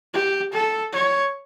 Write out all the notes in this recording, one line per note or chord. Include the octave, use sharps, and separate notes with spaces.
G4
A4
C#5